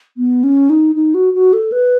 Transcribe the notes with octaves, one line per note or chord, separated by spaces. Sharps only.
B3
C#4
D#4
D#4
F#4
F#4
A4
B4